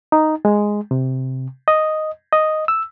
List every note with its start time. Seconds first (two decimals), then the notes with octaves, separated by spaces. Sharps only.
0.12 D#4
0.45 G#3
0.91 C3
1.68 D#5
2.33 D#5
2.68 E6